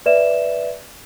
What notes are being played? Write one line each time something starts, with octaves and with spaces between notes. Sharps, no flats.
B4 D5 E5 E7